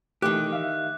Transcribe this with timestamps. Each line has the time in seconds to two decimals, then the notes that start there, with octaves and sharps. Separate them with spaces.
0.22 D#3 E3 A3 G4 D6 F#6
0.53 E5 F5